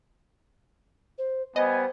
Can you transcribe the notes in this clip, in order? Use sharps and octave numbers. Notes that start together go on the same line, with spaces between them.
C5
G3 B3 C5 D#5 G#5